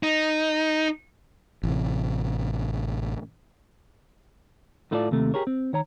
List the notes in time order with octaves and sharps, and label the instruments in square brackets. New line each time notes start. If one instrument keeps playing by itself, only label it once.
[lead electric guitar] D#4
[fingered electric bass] A1 C3
[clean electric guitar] A2 A3 E4 F4 A4 D5
D#2 C3 A3
G4 G#4 A#4 C#5
C4
D#3 C#5 A#5